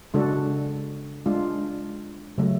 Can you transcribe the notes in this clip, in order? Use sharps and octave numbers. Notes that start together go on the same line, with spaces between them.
C#3 G#3 D4 F#4 A4
G#3 D4 F4
C#3 F#3 A3